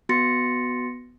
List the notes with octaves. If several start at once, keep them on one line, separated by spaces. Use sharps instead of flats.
B3 F#4 C6 A6 A#6 C#7